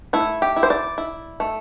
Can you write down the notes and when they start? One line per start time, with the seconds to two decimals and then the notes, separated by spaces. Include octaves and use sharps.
0.13 A3 E4
0.42 G4
0.56 E4
0.63 C5
0.70 D5
0.98 E4
1.40 A3